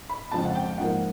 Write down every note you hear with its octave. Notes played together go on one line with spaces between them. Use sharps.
B5
F2 C#3 F3 G#3 A5
F#5
G5
G#2 F3 A#3 F#5